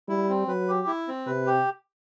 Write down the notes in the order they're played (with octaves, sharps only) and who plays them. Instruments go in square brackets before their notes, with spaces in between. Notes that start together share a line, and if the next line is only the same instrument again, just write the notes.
[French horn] G3 [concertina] E4
[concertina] C4
[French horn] F#3 [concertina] B4
[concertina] G4
E4
C4
[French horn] C3 [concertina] B4
[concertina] G4